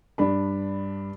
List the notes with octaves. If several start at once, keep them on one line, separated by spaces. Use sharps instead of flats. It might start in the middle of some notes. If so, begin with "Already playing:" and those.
G2 D4 B5